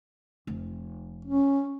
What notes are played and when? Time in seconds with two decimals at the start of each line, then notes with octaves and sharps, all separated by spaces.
0.47 F1
1.25 C#4